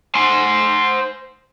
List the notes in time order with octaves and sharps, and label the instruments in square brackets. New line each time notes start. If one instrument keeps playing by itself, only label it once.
[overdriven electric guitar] C5 G#5